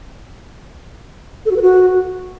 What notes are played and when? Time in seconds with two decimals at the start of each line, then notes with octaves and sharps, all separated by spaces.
1.46 A4
1.51 F#4
1.56 B4
1.62 F#4